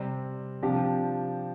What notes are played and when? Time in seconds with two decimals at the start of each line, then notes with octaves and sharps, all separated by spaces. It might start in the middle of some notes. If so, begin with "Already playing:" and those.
Already playing: C3 G3 C4
0.63 C3 F3 D4 G4